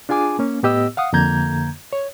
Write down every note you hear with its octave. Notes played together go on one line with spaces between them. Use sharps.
D4 F4 G#4 G#5 D6
A#3 C#4
A2 B3 G4 D#5 E6
F5 F#5 D#6
F2 D3 A#3 A#5 G6 G#6
C#5